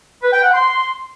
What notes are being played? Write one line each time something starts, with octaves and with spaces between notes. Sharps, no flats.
B4
G5
F#5
C6